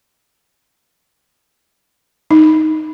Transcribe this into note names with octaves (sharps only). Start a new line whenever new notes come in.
D#4